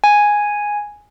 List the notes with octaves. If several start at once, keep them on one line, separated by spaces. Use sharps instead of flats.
G#5